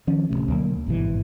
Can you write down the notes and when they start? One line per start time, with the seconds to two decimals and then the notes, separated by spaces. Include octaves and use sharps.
0.07 D#3 F3 C#4
0.29 D1 A#1 C3 A3
0.48 D2 B2 F#3 A#3
0.86 G#1 G2 B2 E3